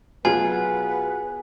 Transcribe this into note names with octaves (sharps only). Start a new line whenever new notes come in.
B2 F#3 B3 F4 G#4 B4 G#5